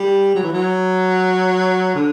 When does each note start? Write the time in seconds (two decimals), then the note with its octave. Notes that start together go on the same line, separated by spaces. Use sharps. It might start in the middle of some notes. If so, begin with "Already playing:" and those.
Already playing: G3
0.35 F#3
0.43 E3
0.53 F#3
1.95 D3